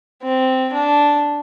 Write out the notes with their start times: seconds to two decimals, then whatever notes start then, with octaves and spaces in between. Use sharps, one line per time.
0.23 C4
0.73 D4